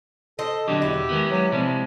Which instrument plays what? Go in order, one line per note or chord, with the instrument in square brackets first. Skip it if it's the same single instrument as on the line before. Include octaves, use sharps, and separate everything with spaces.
[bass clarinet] A4 [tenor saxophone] C5 [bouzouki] D#5
[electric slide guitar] B2 D3 F#3 [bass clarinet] D4 [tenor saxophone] G4
[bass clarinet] E2 [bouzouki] E4
[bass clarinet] D#3 [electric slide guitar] G#3 B3
[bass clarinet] F#3
[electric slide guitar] C3 G#3 [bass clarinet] F3 [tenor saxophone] G3